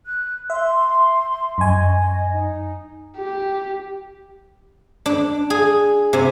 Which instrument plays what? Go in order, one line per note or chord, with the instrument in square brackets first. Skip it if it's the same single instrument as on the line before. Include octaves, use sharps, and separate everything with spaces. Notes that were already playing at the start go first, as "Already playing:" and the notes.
[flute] F#6
[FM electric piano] E5 [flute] C6
[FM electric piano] F#2 G#5 [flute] D#5
[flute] D#4
[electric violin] G4
[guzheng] D4
G#4
C3